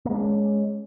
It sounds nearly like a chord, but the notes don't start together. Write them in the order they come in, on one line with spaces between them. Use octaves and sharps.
A#3 G#3 D4 C#4